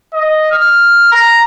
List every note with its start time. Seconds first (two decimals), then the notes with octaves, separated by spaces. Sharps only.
0.14 D#5
0.51 F6
1.12 A#5